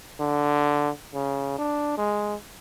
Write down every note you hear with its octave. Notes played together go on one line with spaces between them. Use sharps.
D3
C#3
D4
G#3